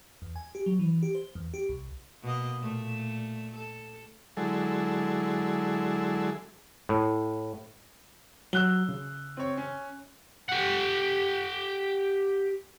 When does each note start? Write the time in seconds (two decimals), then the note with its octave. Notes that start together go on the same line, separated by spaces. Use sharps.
0.22 E2
0.36 G#5
0.55 G4
0.66 F#3
0.79 E3
1.03 G4
1.15 C5
1.35 E2
1.54 G4
1.69 C2
2.23 B2 A#3 D#5
2.60 A#2 A3
3.56 A4
4.37 D3 F#3 G#3 E4 G#4 A4
6.89 A2
8.53 F#3 E6 F#6 G7
8.89 C#3
9.37 C4 C#5
9.57 C#4
10.49 G4 F#5